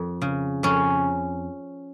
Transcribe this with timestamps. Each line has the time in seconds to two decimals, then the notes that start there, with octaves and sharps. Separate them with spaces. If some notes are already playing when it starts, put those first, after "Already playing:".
Already playing: F2
0.22 C#3
0.63 F2 C#4